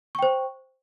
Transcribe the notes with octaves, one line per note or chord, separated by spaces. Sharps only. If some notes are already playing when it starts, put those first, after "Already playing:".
C5 G5 C#6